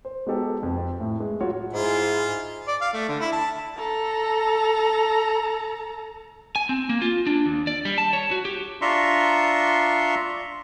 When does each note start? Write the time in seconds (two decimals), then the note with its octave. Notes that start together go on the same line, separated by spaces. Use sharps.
0.05 C5
0.27 G#3 B3 D#4 F#4 G4 A4
0.63 F2
1.00 A2
1.20 G#3
1.41 F#3 F4 F#4 C#5
1.73 G#2 E4 F4 G#4
2.67 D5
2.81 F5
2.93 A3
3.09 D3
3.20 E4
3.32 A5
3.78 A4 A#5
6.56 G#5
6.69 C4
6.89 A#3
7.02 F4
7.27 D4
7.46 D#2
7.67 D5
7.85 G3
7.98 A5
8.13 C#5
8.31 F#4
8.45 G4
8.81 D4 F4 E5 A#5 C6 C#6